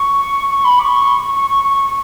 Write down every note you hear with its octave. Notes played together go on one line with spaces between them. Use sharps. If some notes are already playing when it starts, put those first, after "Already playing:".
Already playing: C#6
C#6
B5
D6
C#6
C#6
C#6
C#6